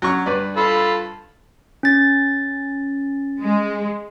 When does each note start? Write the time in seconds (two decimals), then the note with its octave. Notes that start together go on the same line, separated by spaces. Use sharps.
0.02 F#3 C#4 C#6
0.26 G2 B4 D5
0.57 F4 A4 B5
1.83 C#4 A6
3.41 G#3